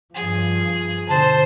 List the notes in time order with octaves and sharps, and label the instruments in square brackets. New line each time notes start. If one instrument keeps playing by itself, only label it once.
[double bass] G2 F3 [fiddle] G#4
[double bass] B2 D3 [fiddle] C5 [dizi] A5